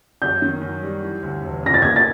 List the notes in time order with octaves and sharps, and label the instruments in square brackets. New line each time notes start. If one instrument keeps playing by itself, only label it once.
[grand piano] F#2 [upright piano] G6
[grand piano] D#3
F#2
G3
E3
D2
E1
[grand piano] C#3 [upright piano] A#6
[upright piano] A6
[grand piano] A#3 [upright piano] G#6
[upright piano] A6